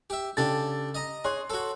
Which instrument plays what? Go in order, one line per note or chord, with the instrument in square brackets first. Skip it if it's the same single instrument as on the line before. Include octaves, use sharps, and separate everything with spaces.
[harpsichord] G4 E5
[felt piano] C#3 A6 [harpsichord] D4 G4 A4
[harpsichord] D#5 A#5
[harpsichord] G#4 [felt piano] C#5 C6 F#6
[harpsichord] F#4 A4